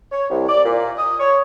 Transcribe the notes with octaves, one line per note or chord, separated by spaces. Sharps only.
C#5
C2
D5
A#2
D#6
C#5